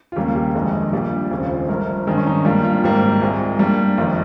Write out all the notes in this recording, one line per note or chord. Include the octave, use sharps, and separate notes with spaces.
F4
D#2 C#3 G3 A#3 G4
G4
G1 F2 D#3 G#3
A#1 A#2 G3 G4
F1 D#2 C#3 F3
G1 G2 F3 A#4
G#1 G2 D#3 G#3 G#4
C#4
D#4
G2 G3 A#3 F4
F4
G#1 G#2 G3 A#3 G4
C2 A#2 G#3
G2 G3 A#3
G1 F2 D#3 F4